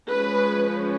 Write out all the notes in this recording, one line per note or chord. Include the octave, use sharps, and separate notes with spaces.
F3 G#3 C#4 B4